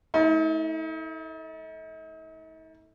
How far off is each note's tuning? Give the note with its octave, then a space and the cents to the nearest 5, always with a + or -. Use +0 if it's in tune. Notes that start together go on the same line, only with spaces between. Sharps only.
A3 +0 D#4 +45